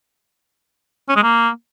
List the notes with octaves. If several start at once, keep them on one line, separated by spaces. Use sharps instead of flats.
C#4
G#3
A#3